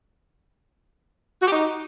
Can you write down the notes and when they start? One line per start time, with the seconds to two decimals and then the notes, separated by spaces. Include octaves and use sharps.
1.42 F#4
1.47 G4
1.52 D#4